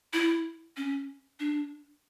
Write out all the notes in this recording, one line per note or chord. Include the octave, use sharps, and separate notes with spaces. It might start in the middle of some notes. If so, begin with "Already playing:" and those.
E4
C#4
D4